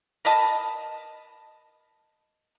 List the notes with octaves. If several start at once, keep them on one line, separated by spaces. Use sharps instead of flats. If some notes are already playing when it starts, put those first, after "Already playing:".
A#4 B4 D#5 A5